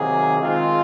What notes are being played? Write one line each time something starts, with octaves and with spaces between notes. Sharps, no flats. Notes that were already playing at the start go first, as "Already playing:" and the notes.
Already playing: C3 D#3 F#3 A#3 G#4
D#3 G#3 C4 F4